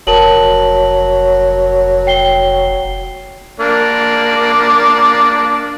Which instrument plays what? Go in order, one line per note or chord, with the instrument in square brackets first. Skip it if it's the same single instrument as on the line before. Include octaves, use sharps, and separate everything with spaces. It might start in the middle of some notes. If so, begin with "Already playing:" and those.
[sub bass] F1 [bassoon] F#3 [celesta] A#4 A5 F#7
[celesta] G5 C7 G7
[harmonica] A#3 D4 D5